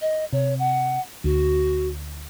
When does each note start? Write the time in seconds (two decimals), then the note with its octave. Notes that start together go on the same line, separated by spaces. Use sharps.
0.01 D#5
0.33 C3 C#5
0.59 F#5
1.24 D2 F#4